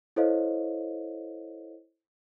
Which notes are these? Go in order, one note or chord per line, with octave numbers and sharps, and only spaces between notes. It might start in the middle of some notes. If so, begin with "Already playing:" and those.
E4 A4 C5 C#5 D#5 F5